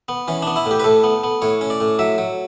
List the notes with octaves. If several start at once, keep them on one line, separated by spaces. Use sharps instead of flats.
B3
E3 C#4
B3 D4
E4
A2
G4
B4
A2 A4
B3
B3
A2 C#5
C#4
D5
A2
F#3 E5
F#3